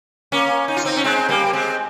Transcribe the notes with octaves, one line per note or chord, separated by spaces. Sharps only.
A#3 C#4
D#4
F4
C4 D#4
C#4
G#3 C4
G3 A#3
A#3
G#3 C4